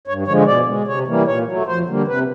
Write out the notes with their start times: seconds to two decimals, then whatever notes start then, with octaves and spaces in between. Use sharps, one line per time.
0.08 G2 C#5
0.27 D3 F3 G#3 C#5
0.47 B2 D5
0.67 G#3
0.87 C3 C#5
1.07 E3 G3 A#3
1.27 A#2 C#5
1.46 F#3 A3
1.67 F2 C5
1.88 D3 G3 A#3
2.07 C3 B4